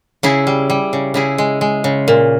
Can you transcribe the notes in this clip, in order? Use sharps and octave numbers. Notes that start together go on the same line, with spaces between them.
C#3 E4 G#4
G3
G3
C#3
C#3 E4 G#4
G#3
G#3
C#3
A#2